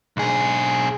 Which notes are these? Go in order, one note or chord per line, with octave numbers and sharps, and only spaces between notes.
B1 G#4